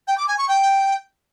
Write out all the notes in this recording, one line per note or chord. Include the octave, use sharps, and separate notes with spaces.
G5
D6
G#5
C#6
G5